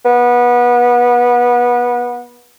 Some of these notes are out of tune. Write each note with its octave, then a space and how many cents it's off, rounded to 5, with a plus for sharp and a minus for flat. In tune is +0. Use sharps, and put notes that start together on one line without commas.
B3 -25